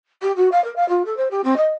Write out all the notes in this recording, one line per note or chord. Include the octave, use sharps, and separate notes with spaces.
G4
F#4
F5
A#4
F5
F4
A4
C5
G4
C4
D#5